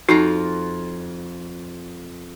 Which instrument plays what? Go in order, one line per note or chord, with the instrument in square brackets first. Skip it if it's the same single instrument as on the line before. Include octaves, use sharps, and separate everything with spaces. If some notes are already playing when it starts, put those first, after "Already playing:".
[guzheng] F2 F4 A#5 [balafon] D#4 F#4